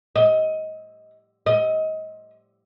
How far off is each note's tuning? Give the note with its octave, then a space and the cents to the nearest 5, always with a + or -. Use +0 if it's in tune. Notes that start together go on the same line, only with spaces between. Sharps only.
D#5 +15
D#5 +20